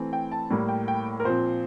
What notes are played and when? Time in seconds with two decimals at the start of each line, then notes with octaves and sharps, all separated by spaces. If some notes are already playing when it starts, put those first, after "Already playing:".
Already playing: E3 A3 C4
0.13 G5
0.32 A5
0.50 A2 G3 A#3
0.69 G5
0.88 G5
1.20 A#4
1.25 A#2 F3 C4 C5